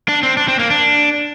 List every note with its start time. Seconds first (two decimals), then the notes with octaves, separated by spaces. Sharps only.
0.08 D4
0.23 C4
0.37 D4
0.48 C4
0.59 A#3
0.70 D4